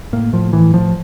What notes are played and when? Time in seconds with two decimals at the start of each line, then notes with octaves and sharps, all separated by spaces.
0.13 A2 A#3
0.33 A2 F3
0.53 A2 E3
0.74 A2 F3